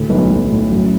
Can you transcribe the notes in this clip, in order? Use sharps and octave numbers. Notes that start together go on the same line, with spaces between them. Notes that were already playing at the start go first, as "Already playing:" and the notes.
Already playing: D2 A2
B1 B4
B1
A2
F#2